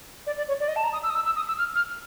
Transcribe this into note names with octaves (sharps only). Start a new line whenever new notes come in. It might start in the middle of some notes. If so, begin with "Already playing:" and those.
D5
D5
C#5
D5
D#5
A5
A#5
D#6
E6
D#6
E6
E6
D#6
E6
F6
F6